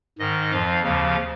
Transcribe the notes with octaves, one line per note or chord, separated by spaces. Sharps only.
G#2 D#3 D#5
F2 F3 F5
D#2 C#3 F3 F5